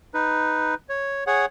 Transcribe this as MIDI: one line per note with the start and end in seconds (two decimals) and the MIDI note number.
0.14 0.75 63
0.14 0.75 71
0.89 1.24 73
1.27 1.46 68
1.27 1.46 73
1.27 1.46 78